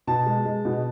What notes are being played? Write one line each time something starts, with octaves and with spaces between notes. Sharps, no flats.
B2 A5
G#3
G#3
B2